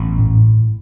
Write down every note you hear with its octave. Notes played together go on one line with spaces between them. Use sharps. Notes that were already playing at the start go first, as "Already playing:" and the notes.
Already playing: A1 B3
A2